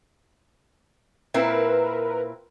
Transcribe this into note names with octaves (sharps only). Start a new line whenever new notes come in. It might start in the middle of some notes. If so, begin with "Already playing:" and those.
A#2 C4 E4 A#4 B4